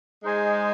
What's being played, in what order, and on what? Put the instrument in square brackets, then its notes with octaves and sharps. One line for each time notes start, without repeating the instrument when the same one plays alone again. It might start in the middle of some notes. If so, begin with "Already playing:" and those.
[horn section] G#3 [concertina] D#4 C5 G#5